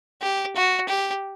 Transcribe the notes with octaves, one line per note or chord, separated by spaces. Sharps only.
G4
F#4
G4